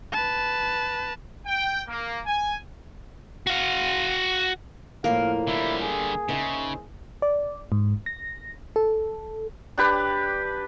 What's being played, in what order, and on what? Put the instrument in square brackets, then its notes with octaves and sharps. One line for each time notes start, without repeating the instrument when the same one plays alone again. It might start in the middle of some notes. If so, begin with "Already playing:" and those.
[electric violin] B4 A5
[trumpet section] G5
A#3
G#5
[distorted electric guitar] F#4 F5
[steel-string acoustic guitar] D2 A2 F3 [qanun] A#3 A#4 [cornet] F5
[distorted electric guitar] D3 G3 [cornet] E4
[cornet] G#4
[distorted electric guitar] C#3 [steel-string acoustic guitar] D#4 C5 E5
[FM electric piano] D5
G#2
A#6
A4
[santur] D4 G4 B4